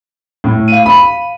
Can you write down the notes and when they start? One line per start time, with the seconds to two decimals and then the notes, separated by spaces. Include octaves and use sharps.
0.44 A2
0.68 F5 D#7
0.86 B5